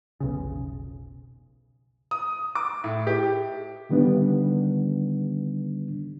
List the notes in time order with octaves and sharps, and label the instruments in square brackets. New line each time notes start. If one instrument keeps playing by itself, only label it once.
[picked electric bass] F1 B1 C#3
[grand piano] D#6
D6
A2
G4
[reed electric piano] D3 D#3 G3 B3 D4